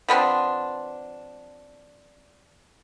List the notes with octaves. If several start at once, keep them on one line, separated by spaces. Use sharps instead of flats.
F3 B3 C4 D4